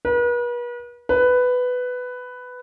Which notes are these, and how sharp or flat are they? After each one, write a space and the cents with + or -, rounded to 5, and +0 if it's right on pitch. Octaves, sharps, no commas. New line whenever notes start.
B4 -40
B4 +10